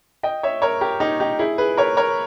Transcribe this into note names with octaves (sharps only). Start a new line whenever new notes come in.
D#5 G5
C#5 E5
A#4 C#5
G4 A#4
D#4 G4
D#4 G4
E4 G#4
G#4 B4
A#4 C#5
A#4 C#5